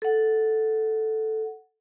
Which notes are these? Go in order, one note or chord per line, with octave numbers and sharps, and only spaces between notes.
A4 F#5